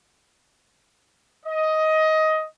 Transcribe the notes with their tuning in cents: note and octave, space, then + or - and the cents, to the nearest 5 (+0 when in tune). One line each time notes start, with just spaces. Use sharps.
D#5 +15